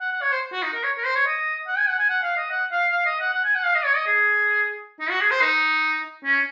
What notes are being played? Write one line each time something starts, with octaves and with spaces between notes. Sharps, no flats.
F#5
F#5
C#5
C5
F#4
D#4
A#4
C#5
A#4
C5
C#5
D#5
F#5
G#5
F#5
G#5
F#5
F5
D#5
F#5
F5
F5
D#5
F#5
F#5
G#5
F#5
F5
D#5
C#5
D#5
G#4
D#4
F#4
G#4
C5
D#4
C#4